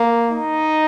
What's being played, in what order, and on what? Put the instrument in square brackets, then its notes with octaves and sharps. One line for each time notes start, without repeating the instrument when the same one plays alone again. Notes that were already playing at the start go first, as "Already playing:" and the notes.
Already playing: [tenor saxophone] A#3
[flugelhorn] D#4